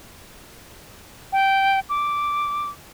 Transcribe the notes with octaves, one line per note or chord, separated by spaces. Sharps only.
G5
D6